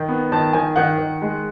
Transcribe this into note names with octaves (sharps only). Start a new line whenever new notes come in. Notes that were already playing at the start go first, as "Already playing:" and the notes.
Already playing: D#3
B3
D#3 A5
D#3 G#5
D#3 F#5
D#3
G#3